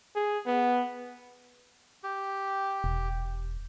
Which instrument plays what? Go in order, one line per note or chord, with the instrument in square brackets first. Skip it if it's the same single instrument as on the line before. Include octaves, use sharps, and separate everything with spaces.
[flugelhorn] G#4
B3
[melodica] G4
[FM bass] E1